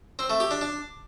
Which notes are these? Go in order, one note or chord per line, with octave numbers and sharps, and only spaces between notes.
C4
A3
G4
D4
D4